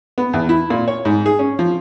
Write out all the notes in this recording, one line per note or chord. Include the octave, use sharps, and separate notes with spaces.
B3
E2
E4
A#2
C#5
G#2
G#4
C#4
F3